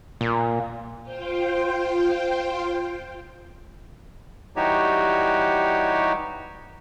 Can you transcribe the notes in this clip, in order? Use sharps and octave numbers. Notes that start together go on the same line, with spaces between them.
A#2
F4 C5 G5
E3 G3 D#4 F#4 G4 C#5